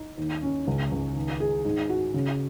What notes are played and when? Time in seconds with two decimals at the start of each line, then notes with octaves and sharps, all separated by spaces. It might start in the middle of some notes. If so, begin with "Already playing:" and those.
Already playing: D#4
0.18 D#2
0.42 C#4
0.67 C#2
0.91 C#2
1.16 D#3
1.40 G#4
1.65 G#2
1.89 F#4
2.14 C#3